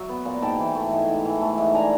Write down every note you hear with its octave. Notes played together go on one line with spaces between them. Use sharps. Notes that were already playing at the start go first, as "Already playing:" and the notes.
Already playing: F#3 E5
B3
A#2
G#2 G5 A5
E3
A3
G#2
G#2
E3
A3
G#2
D4 G#5 A#5